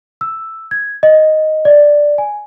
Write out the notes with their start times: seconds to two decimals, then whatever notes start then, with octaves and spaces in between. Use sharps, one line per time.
0.21 E6
0.71 G#6
1.03 D#5
1.65 D5
2.18 G#5